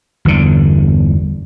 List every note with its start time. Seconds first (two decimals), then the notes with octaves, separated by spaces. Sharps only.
0.25 G1 E2 D3